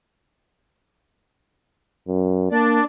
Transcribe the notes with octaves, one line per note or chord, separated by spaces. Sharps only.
F#2
A#3 D4 D5